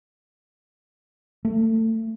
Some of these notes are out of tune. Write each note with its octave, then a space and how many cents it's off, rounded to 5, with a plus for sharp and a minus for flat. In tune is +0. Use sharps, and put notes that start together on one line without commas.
A3 +25